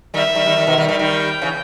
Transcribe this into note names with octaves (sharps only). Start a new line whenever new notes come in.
D#3 G3 E5
D#3 G3
D#3 G3
D#3 G3
B2 D#3
D#3 G3
D#3 G3
D#3 G3 G5
C#3 E3